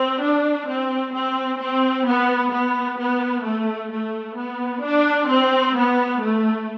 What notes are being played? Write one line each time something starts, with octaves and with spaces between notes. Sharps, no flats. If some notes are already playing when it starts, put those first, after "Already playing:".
Already playing: C4
D4
C4
C4
C4
B3
B3
B3
A3
A3
B3
D4
C4
B3
A3